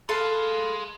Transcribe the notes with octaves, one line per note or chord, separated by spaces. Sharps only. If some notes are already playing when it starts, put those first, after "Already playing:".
G#4 A4 B4 F5 C6